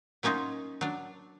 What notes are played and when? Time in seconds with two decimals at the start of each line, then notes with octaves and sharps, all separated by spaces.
0.23 F#3 A#3 C#4 D#4 F4
0.81 F#3 D4